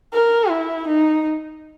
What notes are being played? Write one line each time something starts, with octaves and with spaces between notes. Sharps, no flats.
A#4
E4
D#4